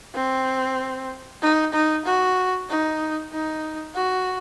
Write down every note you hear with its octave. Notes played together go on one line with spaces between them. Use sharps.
C4
D#4
D#4
F#4
D#4
D#4
F#4